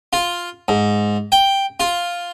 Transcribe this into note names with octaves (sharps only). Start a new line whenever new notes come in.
F4
G#2
G5
F4